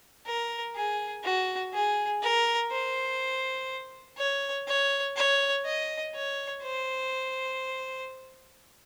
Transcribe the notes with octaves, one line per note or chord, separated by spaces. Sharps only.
A#4
G#4
F#4
G#4
A#4
C5
C#5
C#5
C#5
D#5
C#5
C5